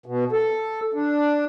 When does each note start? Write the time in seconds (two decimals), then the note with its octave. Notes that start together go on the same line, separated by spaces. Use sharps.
0.06 B2
0.32 A4
0.94 D4